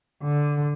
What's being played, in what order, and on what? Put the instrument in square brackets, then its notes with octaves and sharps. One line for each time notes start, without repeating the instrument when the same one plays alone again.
[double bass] D3